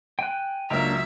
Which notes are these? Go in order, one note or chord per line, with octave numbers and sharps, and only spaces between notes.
G5 G#5 F#6
C#2 F#3 A#3 D4 A#4 E5 A#5